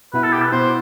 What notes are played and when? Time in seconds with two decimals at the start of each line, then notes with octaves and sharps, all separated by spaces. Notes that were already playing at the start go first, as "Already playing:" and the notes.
0.13 B2 B3 E4 B4
0.23 A4
0.33 G4
0.42 B4
0.52 B2 B3 E4 C5